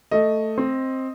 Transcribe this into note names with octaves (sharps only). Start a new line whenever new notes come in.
A3 D#5
C4